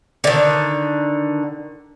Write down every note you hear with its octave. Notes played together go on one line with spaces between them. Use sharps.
D3 D#3